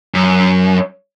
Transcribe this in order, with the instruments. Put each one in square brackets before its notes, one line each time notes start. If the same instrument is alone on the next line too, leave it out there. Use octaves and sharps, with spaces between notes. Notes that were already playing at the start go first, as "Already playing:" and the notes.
[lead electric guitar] F#2